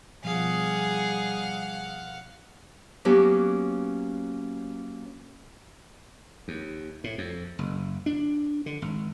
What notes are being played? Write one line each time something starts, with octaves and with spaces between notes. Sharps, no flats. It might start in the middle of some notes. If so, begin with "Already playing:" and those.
B2 F3 G3 G#4 F5 F#5
F#3 A#3 B3 C#4 G4
D#2
A2
F2
F#1
D4
D3
G#1